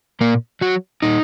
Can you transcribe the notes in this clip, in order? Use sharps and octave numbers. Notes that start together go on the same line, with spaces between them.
A#2 A#3
F#3 F#4
A#2 D#4